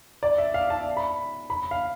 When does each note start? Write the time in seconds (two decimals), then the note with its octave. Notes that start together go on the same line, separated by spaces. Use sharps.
0.23 D5
0.38 E5
0.54 F5
0.70 A5
0.97 B5
1.50 B5
1.71 F5